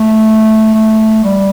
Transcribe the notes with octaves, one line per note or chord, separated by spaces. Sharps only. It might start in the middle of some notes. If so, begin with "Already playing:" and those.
Already playing: A3
A3
G3